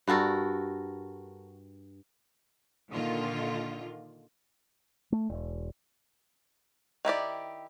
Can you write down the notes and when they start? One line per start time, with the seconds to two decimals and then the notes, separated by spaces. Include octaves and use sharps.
0.07 G2 F#4 A4 A#4
2.90 A#2 D3 D#3 F4
5.12 A3
5.29 E1
7.05 D#3 E4 G4 D5